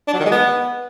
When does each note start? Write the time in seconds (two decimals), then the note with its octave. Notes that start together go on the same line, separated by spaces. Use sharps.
0.08 D4
0.14 F#3
0.20 D#3
0.26 G#3
0.31 B3